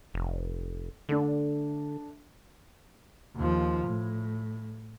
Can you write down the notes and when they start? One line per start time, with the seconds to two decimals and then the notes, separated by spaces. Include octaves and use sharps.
0.14 F1
1.09 D3 A3 D4
3.36 D#2 F3
3.87 A2